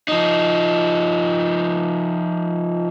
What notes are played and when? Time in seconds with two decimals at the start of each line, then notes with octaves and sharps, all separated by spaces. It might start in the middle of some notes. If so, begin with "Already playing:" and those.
0.08 F3 D#4